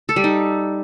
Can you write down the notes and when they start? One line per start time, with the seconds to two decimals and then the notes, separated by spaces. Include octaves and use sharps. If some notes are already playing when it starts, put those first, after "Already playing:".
0.09 A4
0.16 G3
0.24 D#4